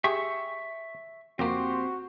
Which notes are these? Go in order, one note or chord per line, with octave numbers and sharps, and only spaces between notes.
G4 G#4 E5 C#6
F2 A#3 C4 F#4 G4 C5